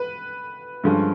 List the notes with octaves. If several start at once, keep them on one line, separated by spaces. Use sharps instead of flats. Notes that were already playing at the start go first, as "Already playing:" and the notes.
Already playing: B4
G2 D3 F3 G#3 C#4